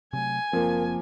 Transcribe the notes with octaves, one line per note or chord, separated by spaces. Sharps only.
C3 F#3 A3 G#5
F#1 F3 A#3 C4 A#4